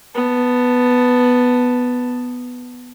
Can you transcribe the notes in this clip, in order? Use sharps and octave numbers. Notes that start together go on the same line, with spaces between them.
B3 A5